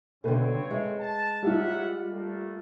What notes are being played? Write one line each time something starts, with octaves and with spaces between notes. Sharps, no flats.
G2 B2 D3 C4 A4 B4 C#5 G5
G#3
A5
F#3 G3 F4 E5 F#5
A3 A#3 D4